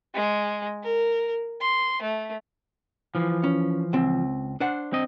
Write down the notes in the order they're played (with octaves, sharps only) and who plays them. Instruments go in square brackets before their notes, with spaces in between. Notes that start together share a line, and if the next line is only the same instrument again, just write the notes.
[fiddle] G#3
A#4
C6
A3
[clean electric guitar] E3 F3
[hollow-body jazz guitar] C#4
C#2 C4
D4 C5 F#5
[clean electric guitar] C4 D#5